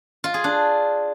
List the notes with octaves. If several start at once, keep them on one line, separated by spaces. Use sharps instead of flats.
F4
G#4
D4